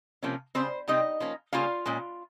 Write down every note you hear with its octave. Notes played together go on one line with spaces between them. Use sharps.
C3 F3 A#3 C#4
C#3 G3 C4 C5
C3 G3 C4 D#4 D#5
F3 A#3 C#4
C#3 G3 A#3 C#4 F4 F5
A#2 G#3 C#4